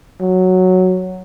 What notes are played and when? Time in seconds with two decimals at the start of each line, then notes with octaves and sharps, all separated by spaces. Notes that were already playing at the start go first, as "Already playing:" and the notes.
0.21 F#3